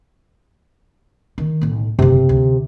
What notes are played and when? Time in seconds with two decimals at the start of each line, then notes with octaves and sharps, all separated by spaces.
1.38 D#3
1.61 B1 A2
1.99 F#1 E2 C3
2.29 D2